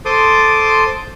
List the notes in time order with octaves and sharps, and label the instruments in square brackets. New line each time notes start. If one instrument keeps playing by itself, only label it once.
[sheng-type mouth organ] A4 C5 C6 D6 D#6